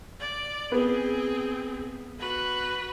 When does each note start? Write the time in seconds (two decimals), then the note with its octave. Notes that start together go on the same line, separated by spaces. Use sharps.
0.19 D5
0.72 B3 C4 G#4
2.19 F#4 B4